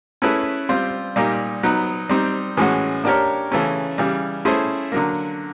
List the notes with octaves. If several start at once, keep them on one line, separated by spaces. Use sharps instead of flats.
A3 C#4 E4 G#4 B4
G3 C4 F4
A#2 G3 A#3 D#4
F#3 B3 D#4
G3 C4 D#4
A2 E3 G#3 C#4 F#4
A#3 D4 G4 A#4 C#5
C#3 E3 A3 C#4
C#3 E3 G3
A3 C#4 E4 G#4 C5
D3 F#3 A#3